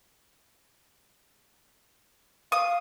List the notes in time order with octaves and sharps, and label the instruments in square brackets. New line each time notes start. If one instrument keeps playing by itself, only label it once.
[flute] F5 [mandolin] D#6